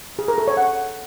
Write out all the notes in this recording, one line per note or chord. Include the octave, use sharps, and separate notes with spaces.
G#4
A#4
A4
C#5
F#5